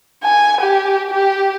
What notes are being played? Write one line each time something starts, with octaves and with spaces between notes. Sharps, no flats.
G#5
G4
G4